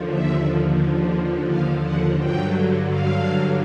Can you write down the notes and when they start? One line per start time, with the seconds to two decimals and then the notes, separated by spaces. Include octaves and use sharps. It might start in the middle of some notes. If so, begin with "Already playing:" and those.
Already playing: D#2 D3 F3
0.09 E5
1.49 F5
1.83 F#5
2.18 G2 D3 F#3 G5
2.89 F5